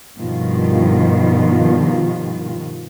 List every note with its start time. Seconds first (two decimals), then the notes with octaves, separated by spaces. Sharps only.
0.19 G2 B2 D#3 F3 F4